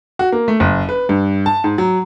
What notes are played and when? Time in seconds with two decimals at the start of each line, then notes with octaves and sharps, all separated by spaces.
0.19 F#4
0.32 A#3
0.48 A3
0.60 F#1
0.89 B4
1.09 G2
1.46 A5
1.64 G#2
1.78 F#3